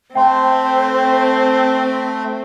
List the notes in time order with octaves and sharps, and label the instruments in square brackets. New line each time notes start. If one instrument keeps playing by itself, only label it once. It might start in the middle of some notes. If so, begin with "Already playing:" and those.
[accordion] A3 [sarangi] C4 [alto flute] C5 [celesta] G5 C6